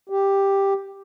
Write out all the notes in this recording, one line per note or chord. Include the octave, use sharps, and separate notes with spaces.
G4